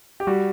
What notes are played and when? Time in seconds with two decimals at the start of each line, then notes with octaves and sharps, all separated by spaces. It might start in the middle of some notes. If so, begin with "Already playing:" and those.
0.20 G4
0.27 G3 F#4